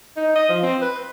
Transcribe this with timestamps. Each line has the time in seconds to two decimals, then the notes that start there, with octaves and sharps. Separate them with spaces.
0.17 D#4
0.36 D#5
0.49 F3
0.63 C4
0.82 B4